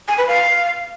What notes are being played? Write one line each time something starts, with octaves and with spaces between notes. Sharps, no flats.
G#5
B4
F5